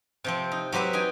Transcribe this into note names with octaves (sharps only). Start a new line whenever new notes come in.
C3 F3 C4
D#4
F#3 C4 G4 B4 E5
D#4 G5 G#5